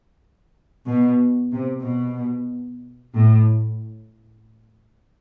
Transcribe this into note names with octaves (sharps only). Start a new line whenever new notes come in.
B2
C3
B2
A2